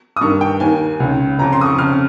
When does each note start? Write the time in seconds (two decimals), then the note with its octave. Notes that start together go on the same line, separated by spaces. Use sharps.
0.16 D#6
0.21 G2 D#3 C#6
0.41 G5
0.60 D#2 D#3 G#5
1.00 C#2 C#3
1.39 F2 C#3 A#5
1.52 C6
1.61 D#6
1.65 C#6
1.78 F2 C#3 F6